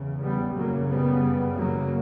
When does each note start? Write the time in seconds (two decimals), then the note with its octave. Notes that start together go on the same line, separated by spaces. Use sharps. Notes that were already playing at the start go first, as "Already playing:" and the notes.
Already playing: E2 C#3
0.21 G3 B3
0.55 F#2 C#3 F#3 A#3
0.89 G3 B3
1.56 F#3 A#3